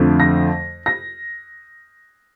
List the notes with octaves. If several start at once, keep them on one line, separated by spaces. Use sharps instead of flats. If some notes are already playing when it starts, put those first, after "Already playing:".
Already playing: F2 D3 F3 A3 C4
A#6
A#6